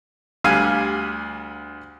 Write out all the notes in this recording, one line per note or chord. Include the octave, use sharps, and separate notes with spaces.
D2 G3 F5 G#5